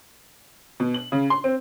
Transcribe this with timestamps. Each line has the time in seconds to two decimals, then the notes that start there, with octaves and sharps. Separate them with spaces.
0.80 B2
0.94 F#7
1.12 C#3
1.30 C6
1.44 C4